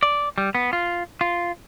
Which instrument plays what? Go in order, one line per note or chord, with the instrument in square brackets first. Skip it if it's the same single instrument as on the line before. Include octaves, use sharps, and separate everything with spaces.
[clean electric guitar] D5
G3
B3
F4
F4